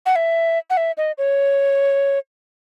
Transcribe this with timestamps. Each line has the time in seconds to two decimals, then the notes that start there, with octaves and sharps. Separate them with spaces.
0.06 F#5
0.16 E5
0.70 F#5
0.77 E5
0.97 D#5
1.18 C#5